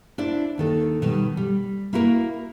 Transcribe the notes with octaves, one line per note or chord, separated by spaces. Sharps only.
D4 E4 C5 D5
D#2 D#3 A4
B2 D#3 G3
G3
A#3 E4 F#4 G4 A#4